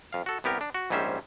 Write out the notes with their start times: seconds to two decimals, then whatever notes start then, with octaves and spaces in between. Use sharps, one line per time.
0.13 F2 F5
0.26 F#4 A4
0.44 C2 B3 G4 A#4
0.61 D4
0.75 F#4
0.90 A#1 G#2 G3 C#4 C5 E5